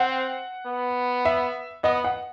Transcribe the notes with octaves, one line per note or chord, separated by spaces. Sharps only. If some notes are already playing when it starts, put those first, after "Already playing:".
Already playing: C4 F#5
B3
E5
B3 D#5
F#5